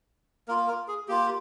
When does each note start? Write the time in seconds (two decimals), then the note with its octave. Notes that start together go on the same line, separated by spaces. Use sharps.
0.48 A#3 F4 A#4
0.68 A#4
0.88 G#4
1.08 A#3 F4 G4